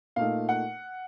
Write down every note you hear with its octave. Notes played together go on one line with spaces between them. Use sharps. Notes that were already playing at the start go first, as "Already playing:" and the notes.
A#2 A3 D#4 F5
F#5